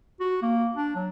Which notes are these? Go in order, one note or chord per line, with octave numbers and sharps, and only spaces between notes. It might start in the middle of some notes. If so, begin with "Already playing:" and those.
F#4
A#3
D4
F#3